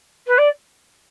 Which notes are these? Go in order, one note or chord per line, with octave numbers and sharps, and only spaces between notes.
B4
D5